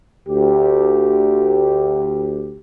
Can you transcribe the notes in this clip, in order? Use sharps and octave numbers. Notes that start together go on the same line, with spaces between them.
D2 G4